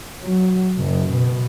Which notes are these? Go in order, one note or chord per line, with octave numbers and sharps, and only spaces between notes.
F#3
F#1
B2